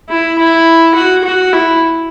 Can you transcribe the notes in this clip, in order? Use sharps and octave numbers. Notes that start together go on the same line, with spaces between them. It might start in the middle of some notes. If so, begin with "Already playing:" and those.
E4
E4
F#4
F#4
E4